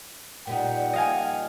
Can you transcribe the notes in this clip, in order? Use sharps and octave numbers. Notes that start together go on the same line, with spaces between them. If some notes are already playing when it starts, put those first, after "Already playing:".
A#2 G3 D#4 F#5 G5
D#5 F5 G#5